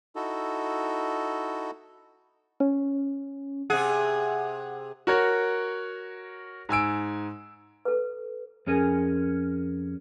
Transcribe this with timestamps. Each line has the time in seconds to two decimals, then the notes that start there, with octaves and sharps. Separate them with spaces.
0.16 D#4 E4 F#4 A4
2.60 C#4
3.70 C3 G#4 F#5
5.07 F#4 A#4 C#5
6.69 G#2 G#5 E6 D7
7.85 A4 B4
8.67 F2 C#4 G#4 A#4 G#5